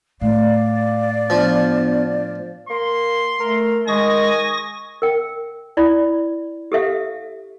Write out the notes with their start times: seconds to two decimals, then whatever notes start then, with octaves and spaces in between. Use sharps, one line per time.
0.21 A2 D5 F5
1.30 F3 B3 D4
2.69 A#3 C6
3.40 A3 A#4
3.87 D#3 G#3 G#5 C#6 D#6 A#6
5.02 A#4 G5
5.77 E4 D5 B5
6.72 G4 A4 E5 F5